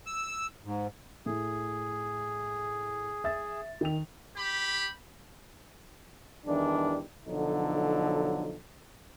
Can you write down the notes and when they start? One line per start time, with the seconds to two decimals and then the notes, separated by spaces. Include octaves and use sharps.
0.06 E6
0.65 G#2
1.26 A2 G#4
3.24 E5 A6
3.81 D#3 G5 F7
4.36 G4 B5
6.46 E2 D#3 E3 G3 D4
7.27 B1 D3 F3 F#3 D#4 A4